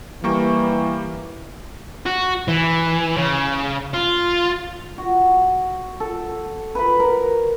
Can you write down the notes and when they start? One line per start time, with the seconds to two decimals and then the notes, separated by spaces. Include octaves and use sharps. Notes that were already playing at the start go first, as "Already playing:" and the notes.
0.24 E3 G3 A#3 C#6
2.06 F#4
2.48 E3
3.16 C#3
3.94 F4
4.98 F#4
6.00 A4
6.75 B4 B5
7.00 A#4